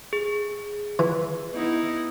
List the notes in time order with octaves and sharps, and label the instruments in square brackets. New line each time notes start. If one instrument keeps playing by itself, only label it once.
[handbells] G#4
[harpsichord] E3
[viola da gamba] B3 D#4 E4